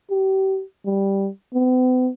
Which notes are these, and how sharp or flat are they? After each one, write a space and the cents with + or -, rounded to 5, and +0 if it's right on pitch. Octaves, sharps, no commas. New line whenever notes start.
G4 -35
G3 +0
B3 +45